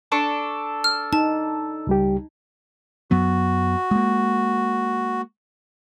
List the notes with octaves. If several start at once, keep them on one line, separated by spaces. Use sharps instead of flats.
D4 A4 C#6
F6
D#4 A5
C#2 G3 G4
F#2 F#3 B3 F#4
G#3 A#3